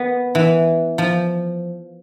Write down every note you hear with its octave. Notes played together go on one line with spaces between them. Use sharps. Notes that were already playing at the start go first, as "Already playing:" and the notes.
Already playing: B3
E3
F3